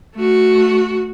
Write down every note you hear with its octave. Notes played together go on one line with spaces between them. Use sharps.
A3 F#4